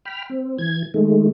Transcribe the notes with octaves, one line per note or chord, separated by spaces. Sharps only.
G5 B5 F6
C4
E3 G#6
D#3 G#3 A3